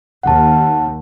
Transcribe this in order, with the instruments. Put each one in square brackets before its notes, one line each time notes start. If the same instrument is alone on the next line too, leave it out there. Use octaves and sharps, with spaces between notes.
[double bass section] D#2 [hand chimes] F#5 A5